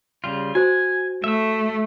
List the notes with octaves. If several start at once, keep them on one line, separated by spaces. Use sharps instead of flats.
C#3 G3 F4
F#4 C5 G#5
A3 E5 E6